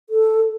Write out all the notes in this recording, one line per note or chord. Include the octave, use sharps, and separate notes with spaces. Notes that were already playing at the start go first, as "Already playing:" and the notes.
A4